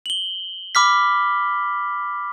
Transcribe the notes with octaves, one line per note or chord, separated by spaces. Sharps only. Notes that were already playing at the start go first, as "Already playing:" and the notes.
F#7 G7
B5 D6 F6 B6